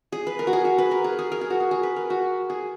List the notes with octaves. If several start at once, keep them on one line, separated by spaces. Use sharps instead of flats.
G#4
B4
A#4
F#4
G#4
F#4
B4
A#4
G#4
G#4
A#4
G#4
F#4
G#4
G#4
B4
A#4
F#4
G#4